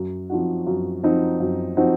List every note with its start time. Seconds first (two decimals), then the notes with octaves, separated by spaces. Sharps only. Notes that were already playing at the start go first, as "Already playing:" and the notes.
Already playing: F#2
0.30 F3 C4 D#4 F#4
0.67 F#2
1.03 F3 C4 D#4 F#4
1.40 F#2
1.77 F3 C4 D#4 F#4